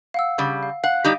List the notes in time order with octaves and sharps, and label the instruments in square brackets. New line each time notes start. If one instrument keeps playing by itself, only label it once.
[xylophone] F5 F#5 E6
[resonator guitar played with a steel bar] C#3 G3
[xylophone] F5
[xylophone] F5 [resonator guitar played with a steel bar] F#5
[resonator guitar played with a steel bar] G3 D#4 G4